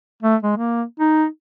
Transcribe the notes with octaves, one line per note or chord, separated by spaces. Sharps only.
A3
G#3
A#3
D#4